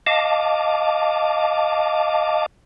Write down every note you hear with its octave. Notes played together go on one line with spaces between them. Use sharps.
D#5 F5 A5 D6